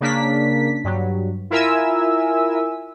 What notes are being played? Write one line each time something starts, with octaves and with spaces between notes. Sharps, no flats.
C#3 A#3 D4 B6
G2 F#3
E4 F4 A#4 E5 G#5 E6